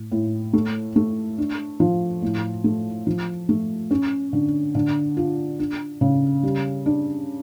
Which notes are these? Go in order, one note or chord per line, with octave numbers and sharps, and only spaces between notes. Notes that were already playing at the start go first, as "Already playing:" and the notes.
Already playing: A2
A2
A3
A3
D4
F3
A2
A3
F3
A3
C#4
D3
D3
F4
D4
C#3
G3
D4